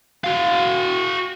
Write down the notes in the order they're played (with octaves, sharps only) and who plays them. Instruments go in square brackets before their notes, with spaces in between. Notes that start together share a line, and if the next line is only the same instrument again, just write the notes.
[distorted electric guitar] F#4 F5